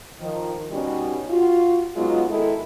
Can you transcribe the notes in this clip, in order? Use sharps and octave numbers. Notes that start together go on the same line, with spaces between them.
D#3 F3
B2 G3 C#4 D#4 F#4 G4
F4 F#4
F#3 G#3 B3 D#4 F4 F#4
D#3 G#3 E4 A4